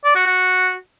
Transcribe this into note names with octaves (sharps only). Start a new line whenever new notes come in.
D5
F#4
F#4